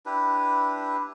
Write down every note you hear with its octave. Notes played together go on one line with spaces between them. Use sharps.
D4 E4 G4 B4